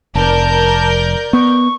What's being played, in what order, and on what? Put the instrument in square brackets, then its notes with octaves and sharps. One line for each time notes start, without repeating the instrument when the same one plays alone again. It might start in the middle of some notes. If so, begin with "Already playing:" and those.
[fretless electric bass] F1 [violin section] A#4 D5 G6 [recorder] A5
[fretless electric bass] B3 [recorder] C#6